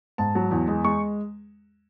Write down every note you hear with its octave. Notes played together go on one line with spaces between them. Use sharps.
G#2 A5
F#3
E2
G#3
G#3 C#6